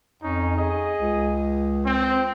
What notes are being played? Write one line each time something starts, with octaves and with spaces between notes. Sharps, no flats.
F2 C#4 D#4
G#4 D#5
C#2
C4